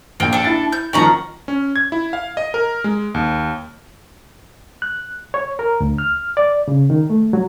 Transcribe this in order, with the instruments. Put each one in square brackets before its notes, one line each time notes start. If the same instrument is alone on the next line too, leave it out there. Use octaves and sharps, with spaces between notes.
[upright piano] A#1 G5 [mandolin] A#3
[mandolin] D4 A4
[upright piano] E4 A6
[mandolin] G6
[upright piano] D#3 F3 [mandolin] C#4 F#4 A#5
[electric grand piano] C#4
G#6
E4
F5
D#5
A#4
G#3
D#2
[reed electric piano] F#6
C#5
A#4
D2
F6
D5
C#3
D#3
A3
F#3